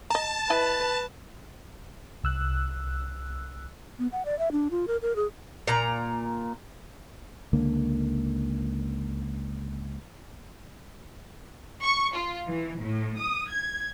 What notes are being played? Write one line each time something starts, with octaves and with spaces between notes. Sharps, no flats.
D#5 A5 A#5
E4 B4 D#5 G#5
C2 E6 F#6
B3
F#5
D5
E5
D4
F4
A#4
A#4
G#4
A#2 A#5
C#2 D3 A#3
C#6
F4
E3
A2
D#6
G#6